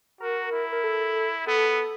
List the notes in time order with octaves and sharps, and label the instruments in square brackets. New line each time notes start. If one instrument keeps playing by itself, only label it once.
[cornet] F#4 [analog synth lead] A#4
[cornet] E4
[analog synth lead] A#4
A4
[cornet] B3 [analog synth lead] A4